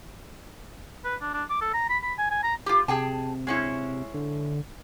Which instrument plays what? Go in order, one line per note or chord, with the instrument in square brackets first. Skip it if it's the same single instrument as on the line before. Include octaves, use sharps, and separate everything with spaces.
[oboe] B4
D4
D4
D6
A4
A#5
B5
B5
G#5
G#5
A#5
[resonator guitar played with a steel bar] F4 G4
[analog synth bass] C3 [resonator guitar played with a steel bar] G#4 G5 A5
[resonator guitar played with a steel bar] G#3 C#4 E4
[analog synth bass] D3